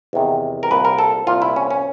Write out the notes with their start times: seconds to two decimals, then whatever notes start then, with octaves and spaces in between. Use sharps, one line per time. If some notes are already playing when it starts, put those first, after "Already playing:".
0.13 E2 C3 D#3
0.63 A#4
0.71 C2 A#2 B4
0.85 A#4
0.99 A4
1.27 C2 A#2 F4
1.42 E4
1.56 C#4
1.71 C#4